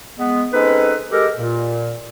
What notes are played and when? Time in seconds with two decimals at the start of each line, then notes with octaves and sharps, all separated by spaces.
0.18 G#3 B3
0.53 G#3 C4 C#4 D#4 A4 B4
1.12 G#3 G4 A4 A#4
1.36 A#2